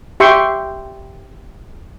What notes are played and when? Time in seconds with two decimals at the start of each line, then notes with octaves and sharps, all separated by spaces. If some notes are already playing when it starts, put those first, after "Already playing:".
0.20 G4 E5 G5 C6 C#6